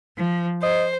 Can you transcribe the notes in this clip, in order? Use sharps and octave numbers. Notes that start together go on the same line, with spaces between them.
F3
C5 D#5